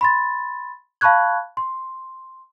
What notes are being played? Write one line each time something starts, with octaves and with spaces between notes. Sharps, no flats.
B5 C6 A6
F5 A5 B5 C#6 F#6 G#6
C6